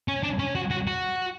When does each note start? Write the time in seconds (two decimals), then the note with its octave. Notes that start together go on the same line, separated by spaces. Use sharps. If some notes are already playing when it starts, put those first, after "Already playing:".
0.08 C#4
0.23 D4
0.39 C#4
0.55 F#4
0.71 F#4
0.87 F#4